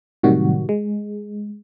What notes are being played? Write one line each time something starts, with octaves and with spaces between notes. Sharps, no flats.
A2 C3 D#3 F#3 G3 F#4
G#3